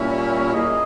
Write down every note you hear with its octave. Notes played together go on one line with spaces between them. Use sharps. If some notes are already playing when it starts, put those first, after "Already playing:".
Already playing: A#2 G3 C#4 E4
A#3 E4 G#4 D#5